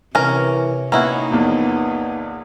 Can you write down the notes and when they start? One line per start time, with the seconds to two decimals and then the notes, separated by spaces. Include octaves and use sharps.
0.15 C3 E3 C#4 A#4
0.92 D#3 A#3 B3 C#4 D#4 E4 F#4 A#5
1.31 A#1 E2 A#2